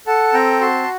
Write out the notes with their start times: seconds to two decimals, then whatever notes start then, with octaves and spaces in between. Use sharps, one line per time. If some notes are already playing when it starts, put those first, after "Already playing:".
0.07 A4 F#5 A5
0.34 C4 G5 A#5
0.61 F#4 A5 C6